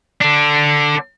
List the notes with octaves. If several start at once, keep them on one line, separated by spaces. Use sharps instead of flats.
D3 D4